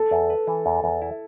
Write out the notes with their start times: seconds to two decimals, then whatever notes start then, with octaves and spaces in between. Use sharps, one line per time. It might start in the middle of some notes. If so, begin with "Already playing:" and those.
Already playing: A4
0.11 E2
0.30 B4
0.47 E3
0.66 E2
0.84 E2
1.02 E4